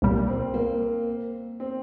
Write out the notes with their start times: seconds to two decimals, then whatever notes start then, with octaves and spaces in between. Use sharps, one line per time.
0.02 C2 A#2 G3 A#3
0.28 C4
0.54 A#3
1.60 C4